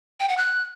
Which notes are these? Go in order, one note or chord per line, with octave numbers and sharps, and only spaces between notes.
G5
F#5
F#6